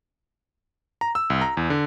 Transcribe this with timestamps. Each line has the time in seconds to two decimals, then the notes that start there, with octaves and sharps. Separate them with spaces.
1.01 A#5
1.15 E6
1.30 C2
1.41 A#5
1.57 E2
1.70 D3